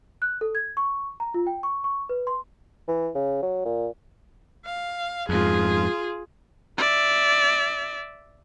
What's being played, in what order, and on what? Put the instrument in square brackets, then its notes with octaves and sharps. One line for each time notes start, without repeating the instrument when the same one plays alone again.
[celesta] F#6
A4
G#6
C#6
A#5
F4
G5
C#6
C#6
B4
C6
[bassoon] E3
C#3
F#3
A#2
[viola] F5
[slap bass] F2 G#2 [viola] F4 G#4
[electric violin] D5 E5